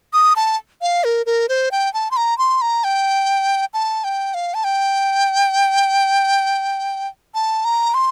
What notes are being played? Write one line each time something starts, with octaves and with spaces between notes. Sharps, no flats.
D#6
A5
F5
A#4
A#4
C5
G5
A5
C6
A#5
C6
A#5
G5
A5
G5
F5
A5
G5
A5
A#5
C6